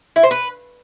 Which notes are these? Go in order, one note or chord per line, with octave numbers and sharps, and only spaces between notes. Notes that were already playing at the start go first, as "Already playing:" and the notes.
E4
C5
B4